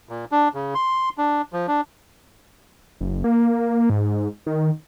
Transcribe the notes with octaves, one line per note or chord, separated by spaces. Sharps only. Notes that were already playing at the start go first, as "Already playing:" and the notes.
A#2
D4
C#3
C6
D4
F3
D4
F#1
A#3
G#2
D#3